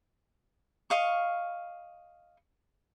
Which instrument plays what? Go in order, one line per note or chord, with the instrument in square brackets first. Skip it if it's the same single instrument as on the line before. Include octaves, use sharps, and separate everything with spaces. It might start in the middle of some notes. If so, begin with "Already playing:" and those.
[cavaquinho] D#5 F5 C#6